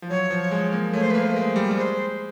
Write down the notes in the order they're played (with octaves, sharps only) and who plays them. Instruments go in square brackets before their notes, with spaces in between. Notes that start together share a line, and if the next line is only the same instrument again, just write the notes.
[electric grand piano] F3
[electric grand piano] F#3 [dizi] C#5
[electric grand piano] F3
G#3
A#3
[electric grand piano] A3 [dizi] C#5
[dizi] C5
B4
[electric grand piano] A#3
[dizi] C5
[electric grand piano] G#3
G3
G3
[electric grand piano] G#3 [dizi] C5